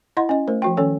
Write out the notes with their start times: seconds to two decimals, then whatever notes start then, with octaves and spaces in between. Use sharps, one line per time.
0.17 E4 D#5 F#5 C6
0.29 C#4 D#5
0.48 A3 A#4 C5
0.62 F3 F#4 G5
0.77 D#3 C#4 A4 C#5